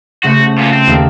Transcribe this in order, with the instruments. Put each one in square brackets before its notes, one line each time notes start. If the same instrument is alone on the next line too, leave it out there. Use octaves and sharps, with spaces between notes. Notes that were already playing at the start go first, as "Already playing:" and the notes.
[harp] C#3 A3 C5 [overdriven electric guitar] F#4
[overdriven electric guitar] A#2 B3
C4
[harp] D#2 A#3 A4